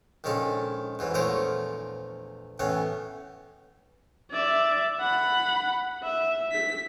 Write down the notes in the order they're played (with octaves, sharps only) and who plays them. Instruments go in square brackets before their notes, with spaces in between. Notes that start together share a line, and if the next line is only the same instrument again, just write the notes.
[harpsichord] A#1 D#3 G#3 C#4 A4
G#2 E3 F#3
A#1 E2 A3 A#4 C5 C#5
A2 E3 B3 C#4
[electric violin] D5 E5
F#5 B5
E5
B6